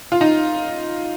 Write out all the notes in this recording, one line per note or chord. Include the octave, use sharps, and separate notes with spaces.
F4
D#4